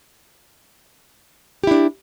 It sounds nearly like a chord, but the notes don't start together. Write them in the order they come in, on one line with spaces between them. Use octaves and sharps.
G4 E4 D4